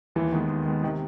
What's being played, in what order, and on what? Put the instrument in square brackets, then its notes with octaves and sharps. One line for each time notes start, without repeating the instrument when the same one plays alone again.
[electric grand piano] D#2 [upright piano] E3
[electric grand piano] D#3 G#3 B3
D#2
D#3 G#3 B3
[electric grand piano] C3 [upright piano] D#3